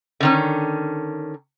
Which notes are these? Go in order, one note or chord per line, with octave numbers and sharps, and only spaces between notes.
D3 D#3 C#4